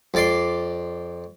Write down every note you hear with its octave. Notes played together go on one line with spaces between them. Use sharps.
F2 D5 C6